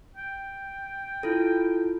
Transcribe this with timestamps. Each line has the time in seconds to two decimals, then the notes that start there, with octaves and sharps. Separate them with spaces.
0.16 G5
1.23 E4 F4 A4